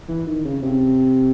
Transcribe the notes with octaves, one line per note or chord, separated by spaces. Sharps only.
E3
D#3
C#3
C3